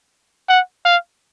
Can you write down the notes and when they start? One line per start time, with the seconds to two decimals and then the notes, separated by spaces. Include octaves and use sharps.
0.49 F#5
0.85 F5